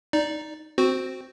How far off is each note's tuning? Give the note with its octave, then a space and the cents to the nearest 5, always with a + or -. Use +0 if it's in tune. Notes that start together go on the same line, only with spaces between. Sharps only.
D#4 +0 D5 +0
C4 +0 F#4 +0 C5 +0